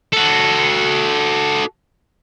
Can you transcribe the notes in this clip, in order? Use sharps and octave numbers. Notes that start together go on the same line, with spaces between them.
F#4 A4